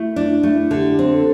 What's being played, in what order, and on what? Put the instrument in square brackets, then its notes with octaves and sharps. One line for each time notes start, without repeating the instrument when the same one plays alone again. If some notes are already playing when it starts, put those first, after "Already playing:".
Already playing: [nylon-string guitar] A3 [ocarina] E4
[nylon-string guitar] D4
[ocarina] E4
[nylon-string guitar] A3
[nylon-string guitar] D3 [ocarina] A4
[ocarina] G4
[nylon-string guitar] C4
[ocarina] A4